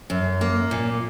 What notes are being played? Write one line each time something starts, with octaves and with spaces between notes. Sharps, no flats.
F#2
A#3
A#2